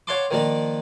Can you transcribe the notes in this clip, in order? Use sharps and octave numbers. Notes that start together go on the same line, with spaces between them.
C#5 F5 F#5 A5 C6 D6
D#3 F3 A#3 D4 A#4